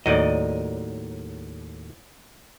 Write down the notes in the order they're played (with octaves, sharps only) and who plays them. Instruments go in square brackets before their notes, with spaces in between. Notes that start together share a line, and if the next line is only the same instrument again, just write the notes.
[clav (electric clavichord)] D#2 A2 F#3 [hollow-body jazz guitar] D5 D#5